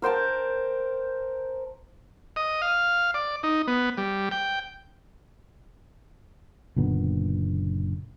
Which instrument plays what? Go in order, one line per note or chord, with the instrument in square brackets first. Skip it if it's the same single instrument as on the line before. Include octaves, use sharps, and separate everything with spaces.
[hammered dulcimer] A#4 C5 G5 A5
[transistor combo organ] D#5
F5
D5
D#4
B3
G3
G5
[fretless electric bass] F#1 A#2 D3 B3